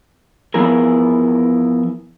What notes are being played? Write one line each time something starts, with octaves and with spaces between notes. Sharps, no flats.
F3 B3 E4 G#4 A#4